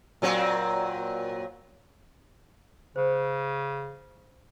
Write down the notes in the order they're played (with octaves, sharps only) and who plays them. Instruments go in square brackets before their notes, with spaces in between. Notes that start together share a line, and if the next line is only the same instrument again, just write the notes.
[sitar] A#2 F#3 C4
[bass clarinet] C#3 [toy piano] C5